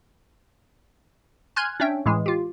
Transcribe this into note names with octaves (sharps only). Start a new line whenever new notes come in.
G#5 C6 F6 F#6 G#6
C#4 D4 C#5 E5 G5
A2 E3 G#3
F4 G4